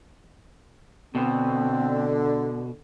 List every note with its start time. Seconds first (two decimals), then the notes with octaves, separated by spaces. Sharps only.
1.15 B2 D3 C4